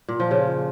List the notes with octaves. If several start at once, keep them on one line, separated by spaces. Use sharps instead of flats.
A#2
F3
C#3